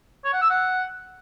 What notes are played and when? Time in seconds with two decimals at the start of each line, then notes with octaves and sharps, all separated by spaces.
0.25 C#5
0.33 F#5
0.42 E6
0.50 F#5